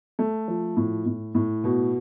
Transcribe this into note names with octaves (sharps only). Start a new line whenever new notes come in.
A3
F3
A2
A2
A2
B2